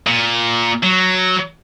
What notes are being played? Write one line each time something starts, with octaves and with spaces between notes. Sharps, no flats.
A#2
F#3